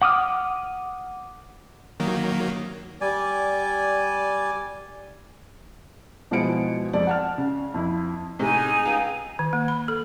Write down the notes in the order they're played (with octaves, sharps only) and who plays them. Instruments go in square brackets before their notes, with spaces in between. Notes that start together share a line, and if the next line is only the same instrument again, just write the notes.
[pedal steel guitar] F#5 D6 D#6 F6
[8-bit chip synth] D#3 F#3 A#3
[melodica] G3 D5 G#5
[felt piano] B2 F3 G#3 E4 C#7 D7
F2 G#3 D5
F#5 A5 F6
C#3
F2 E4
[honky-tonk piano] A2 C3 G#3 [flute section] D#4 G#4 G#5
[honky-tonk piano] C#2
[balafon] D#3
A#3
B5
A4